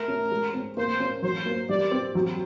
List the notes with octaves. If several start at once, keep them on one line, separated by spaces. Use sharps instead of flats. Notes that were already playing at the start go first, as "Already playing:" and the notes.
Already playing: A3 A#4
C#4
G#3
C4
A#3 C5
C#4
F#3 C5
A#3
G3 D5
C4
F#3